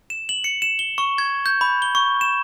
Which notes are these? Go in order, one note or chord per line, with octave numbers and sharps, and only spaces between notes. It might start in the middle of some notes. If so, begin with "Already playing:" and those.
E7
F#7
C#7
E7
G7
C#6
G#6
G6
B5
G7
C#6
E7